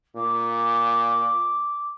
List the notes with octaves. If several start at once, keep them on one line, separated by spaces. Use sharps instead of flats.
A#2 D6